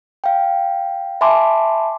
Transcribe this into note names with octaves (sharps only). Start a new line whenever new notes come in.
F5 G5
E5 G#5 A5 B5 C6 D6